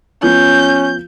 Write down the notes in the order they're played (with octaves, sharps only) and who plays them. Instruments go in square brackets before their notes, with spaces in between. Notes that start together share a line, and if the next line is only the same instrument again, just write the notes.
[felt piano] F3 B3 F4 [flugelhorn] C#4 [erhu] G6